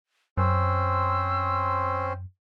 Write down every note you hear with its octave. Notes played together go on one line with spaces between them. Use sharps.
F#2 C4 C#4 C5 E6